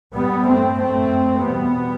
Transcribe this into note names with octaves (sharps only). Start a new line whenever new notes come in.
G2 G3 B3
A3 C4
F#2 A3 C4
E2 B2 G3 B3